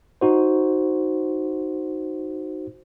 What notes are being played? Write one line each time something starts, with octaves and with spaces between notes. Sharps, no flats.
D#4 F#4 C5